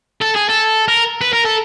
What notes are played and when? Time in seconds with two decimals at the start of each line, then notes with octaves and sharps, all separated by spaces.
0.21 A4
0.35 G#4
0.49 A4
0.88 A#4
1.21 B4
1.33 A#4
1.45 A4